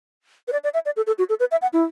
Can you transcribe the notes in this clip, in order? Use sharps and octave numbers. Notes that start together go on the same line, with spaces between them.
B4
D5
D5
E5
D5
A4
A4
F#4
A4
B4
E5
F#5
E4